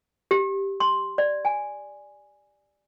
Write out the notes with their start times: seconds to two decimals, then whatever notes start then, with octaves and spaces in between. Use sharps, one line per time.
0.31 G4
0.80 C6
1.18 D5
1.45 G#5